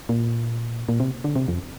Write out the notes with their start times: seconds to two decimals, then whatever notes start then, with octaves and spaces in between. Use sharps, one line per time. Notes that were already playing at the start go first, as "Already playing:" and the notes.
0.09 A#2
0.89 A#2
1.00 C3
1.24 D3
1.36 C3
1.48 F2